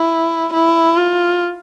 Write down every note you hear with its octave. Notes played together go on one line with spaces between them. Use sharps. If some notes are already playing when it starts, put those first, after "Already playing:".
Already playing: E4
E4
F4